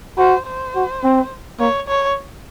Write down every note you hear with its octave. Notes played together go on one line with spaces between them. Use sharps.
F#4 C5
C5
F#4
C4
A#3 C#5
C#5